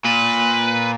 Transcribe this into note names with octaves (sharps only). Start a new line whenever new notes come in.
A#2 B4